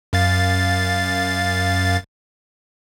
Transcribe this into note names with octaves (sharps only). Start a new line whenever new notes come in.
F#2 F5 A6